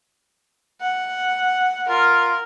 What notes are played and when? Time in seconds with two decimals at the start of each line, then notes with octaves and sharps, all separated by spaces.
0.80 F#5
1.89 F4 A#4